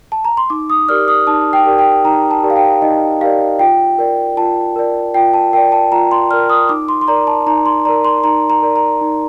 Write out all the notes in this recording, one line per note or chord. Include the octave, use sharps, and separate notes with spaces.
A5
A#5
C6
D#4 D6
D#6
G4 A#4 D5 F6
D#6
D#4 A5
G5
G4 A#4 D5
G5
D#4 A#5
A5
G4 A#4 D5
F5
G5
D#4 D#5
G4 A#4 D5 F5
F4 G5
A#4 D5
F4 A5
A#4 D5
F4 G5
A5
A#4 D5 G5
A5
F4 A#5
C6
A#4 D5 F6
D#6
D#4 D6
C6
C6
A#4 D5 A#5
A5
D#4 A#5
C6
A#4 D5 A#5
C6
D#4 A#5
A#5
A#4 D5
A#5
D#4